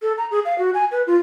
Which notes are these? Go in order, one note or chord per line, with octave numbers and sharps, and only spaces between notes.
A4
A#5
G#4
F5
F#4
G#5
B4
F4